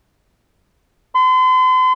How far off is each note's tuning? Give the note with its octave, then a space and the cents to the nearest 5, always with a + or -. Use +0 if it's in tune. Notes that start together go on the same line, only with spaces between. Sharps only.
C6 -40